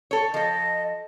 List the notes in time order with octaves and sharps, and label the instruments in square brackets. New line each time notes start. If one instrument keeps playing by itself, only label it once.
[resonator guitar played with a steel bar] A4 C#5
[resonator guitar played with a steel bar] F3 A4 [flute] D#5